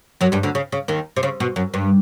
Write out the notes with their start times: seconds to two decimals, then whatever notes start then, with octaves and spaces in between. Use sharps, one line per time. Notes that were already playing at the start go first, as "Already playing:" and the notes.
0.21 F#2 F#3
0.32 G2 G3
0.43 D2 D3
0.55 C#3
0.72 C#3
0.88 D#2 D#3
1.16 C3
1.23 C#3
1.40 B2
1.56 F#2
1.74 G2